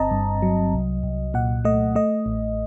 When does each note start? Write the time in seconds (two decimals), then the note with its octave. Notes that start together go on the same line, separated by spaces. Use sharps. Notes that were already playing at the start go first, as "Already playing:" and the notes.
Already playing: G1 C4 D#5 A5 A#5
0.11 G2
0.42 F#3
0.73 C2
1.03 C2
1.34 A#2 F#5
1.65 A3 D#5
1.95 A3 D#5
2.26 A1